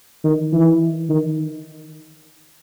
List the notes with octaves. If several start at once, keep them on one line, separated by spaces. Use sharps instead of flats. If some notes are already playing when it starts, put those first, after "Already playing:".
D#3
E3
D#3